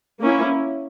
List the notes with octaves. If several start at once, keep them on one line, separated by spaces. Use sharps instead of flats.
A#3 C#4 E4